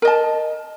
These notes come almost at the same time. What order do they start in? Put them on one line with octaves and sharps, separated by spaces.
A#4 D#5 A5